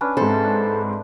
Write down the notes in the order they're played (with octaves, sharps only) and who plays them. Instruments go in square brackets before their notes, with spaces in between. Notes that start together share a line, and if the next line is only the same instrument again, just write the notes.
[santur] C#4 D4 B4
[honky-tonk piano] G#2 C4 [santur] E4 [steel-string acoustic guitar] A4
[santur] D4